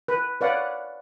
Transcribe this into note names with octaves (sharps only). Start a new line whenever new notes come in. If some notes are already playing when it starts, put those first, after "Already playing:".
B4
B4 C#5 D5 F5 F#5